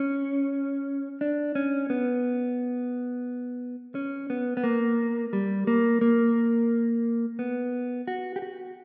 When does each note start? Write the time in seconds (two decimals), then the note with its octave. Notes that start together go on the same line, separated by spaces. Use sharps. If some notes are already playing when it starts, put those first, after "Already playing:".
Already playing: C#4
1.21 D4
1.55 C#4
1.90 B3
3.95 C#4
4.30 B3
4.57 B3
4.64 A#3
5.33 G3
5.67 A#3
6.01 A#3
7.39 B3
8.08 F#4
8.36 G4
8.42 F#4